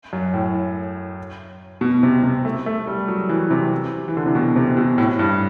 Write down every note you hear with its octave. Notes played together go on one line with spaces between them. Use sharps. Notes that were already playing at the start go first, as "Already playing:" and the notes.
F#2
A2
B2
C3
C3
A3
A3
G3
F#3
E3
C3
E3
D3
C3
B2
C3
B2
A2
G2